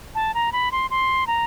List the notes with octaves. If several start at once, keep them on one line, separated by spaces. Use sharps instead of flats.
A5
A#5
B5
C6
C6
A#5